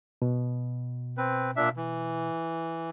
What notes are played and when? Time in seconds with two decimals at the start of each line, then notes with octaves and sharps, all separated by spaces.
0.22 B2
1.18 C4 B4
1.56 A#2 D4 E5
1.77 E3